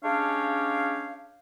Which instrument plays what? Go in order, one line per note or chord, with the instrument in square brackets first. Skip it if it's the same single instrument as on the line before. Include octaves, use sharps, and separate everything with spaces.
[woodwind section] G#3 C#4 D4 G4 C#5 F5